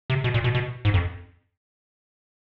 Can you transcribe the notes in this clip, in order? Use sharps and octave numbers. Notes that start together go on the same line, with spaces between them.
C3
B2
A#2
B2
B2
G#2
F2